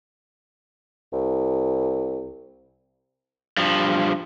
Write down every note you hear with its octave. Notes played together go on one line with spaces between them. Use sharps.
C2
G2 F3